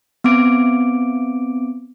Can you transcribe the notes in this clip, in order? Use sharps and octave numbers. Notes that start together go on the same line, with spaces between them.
B3 C4 D6 D7